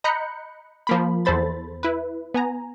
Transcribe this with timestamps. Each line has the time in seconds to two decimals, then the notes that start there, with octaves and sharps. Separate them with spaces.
0.04 D#5 A#5 B5 F#6 G6 C#7
0.87 F3 A#3 B5
1.25 E2 A4 C5 B5 A6
1.83 E4 B4
2.34 B3 G#5 A#5